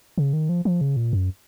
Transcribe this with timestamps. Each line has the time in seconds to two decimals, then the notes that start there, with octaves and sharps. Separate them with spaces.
0.18 C#3
0.33 D#3
0.49 F3
0.65 F3
0.81 C#3
0.96 A#2
1.13 F#2